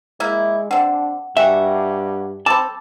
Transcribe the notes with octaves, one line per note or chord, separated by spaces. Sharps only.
G#3 A#3 E4
D3 C4 D4 F#5
G2 F#4 E5 G5 G#5
C4 A4 A5 B5 D6